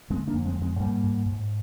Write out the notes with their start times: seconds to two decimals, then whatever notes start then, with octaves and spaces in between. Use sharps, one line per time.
0.10 D3 G#3 C4
0.28 A#3 D4
0.33 F2
0.45 G#3 C4
0.56 F2
0.62 G#3 C4
0.80 G#2 G3 A#3
1.03 G#2
1.26 G#2